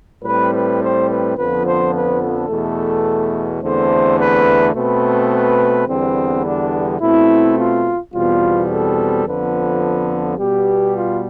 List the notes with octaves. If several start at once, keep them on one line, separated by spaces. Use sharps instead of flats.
A2 G3 C4 B4
B4
C5
B4
F2 D3 F3 B3 B4
C5
B4
A4
E2 B2 A3
E2 D3 A3 C4 C5
B4
B2 A3 C4 B4
B4
E2 D3 G3 B3 C4
D4
B2 A3 C4 E4
F4
E2 B2 G3 C4 F4
A4
F2 D3 F3 B3 B4
B2 G3 B3 G4
F4